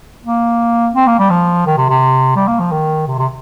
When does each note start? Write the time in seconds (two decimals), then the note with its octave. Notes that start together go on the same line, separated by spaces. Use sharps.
0.25 A#3
0.95 C4
1.07 A#3
1.19 G3
1.30 F3
1.66 D#3
1.78 C3
1.89 C3
2.36 G3
2.48 A#3
2.60 F3
2.72 D#3
3.07 C3
3.18 C3